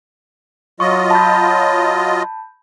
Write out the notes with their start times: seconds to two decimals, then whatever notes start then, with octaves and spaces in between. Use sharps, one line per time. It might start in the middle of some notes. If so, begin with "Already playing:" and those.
0.80 F#3 F4 D#5 C#6
1.11 A5 B5 G6